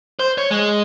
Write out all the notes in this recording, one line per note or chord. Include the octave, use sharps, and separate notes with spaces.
C5
C#5
G#3